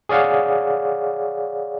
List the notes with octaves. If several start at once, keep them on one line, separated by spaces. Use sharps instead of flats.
G#4 C#5 D5 F5 F#5